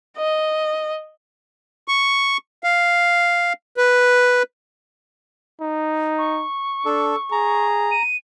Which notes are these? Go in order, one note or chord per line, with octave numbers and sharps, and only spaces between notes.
D#5
C#6
F5
B4
D#4
C#6
D4 A4
G#4 A#5
D#7